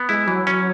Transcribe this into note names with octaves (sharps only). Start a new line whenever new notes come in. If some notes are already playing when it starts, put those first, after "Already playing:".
Already playing: B3
G#3 E4
E3 F#3
C#4